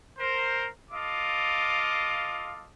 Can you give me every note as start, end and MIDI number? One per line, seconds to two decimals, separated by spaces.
0.19 0.68 70
0.19 0.68 72
0.91 2.68 65
0.91 2.68 69
0.91 2.68 75
0.91 2.68 77
0.91 2.68 86